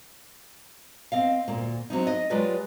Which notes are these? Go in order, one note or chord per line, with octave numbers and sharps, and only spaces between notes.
C4 D#5 F5
D2 A#2 A#3
A2 F#3 C4 D#4
D#5
F#3 G#3 F4 G4 B4 D5